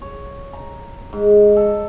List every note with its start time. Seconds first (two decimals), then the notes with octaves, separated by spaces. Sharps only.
0.02 C#5
0.53 A#5
1.13 G#2
1.56 A4